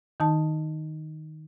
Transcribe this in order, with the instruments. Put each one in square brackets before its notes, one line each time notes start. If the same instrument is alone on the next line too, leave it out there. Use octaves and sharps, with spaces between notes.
[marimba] D#3 D#4 A5